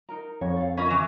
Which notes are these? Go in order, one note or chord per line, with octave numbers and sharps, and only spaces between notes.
D#4 A#4 A#5
F2 C#5
A4 F5
C#4 F4 A#4 B4 D#5
E3 D#5 G#5